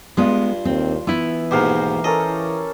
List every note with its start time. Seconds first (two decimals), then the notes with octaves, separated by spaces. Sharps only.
0.17 G2 G#3 B3 F4
0.65 D#2 C4
1.07 E3 B3 E4 E6
1.51 D#2 G#2 B2 G4 F5 A#5
2.04 C#4 A4 A#4 D#5